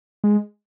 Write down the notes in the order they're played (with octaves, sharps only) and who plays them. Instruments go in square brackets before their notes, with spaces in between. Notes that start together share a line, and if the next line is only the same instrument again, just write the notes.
[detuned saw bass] G#3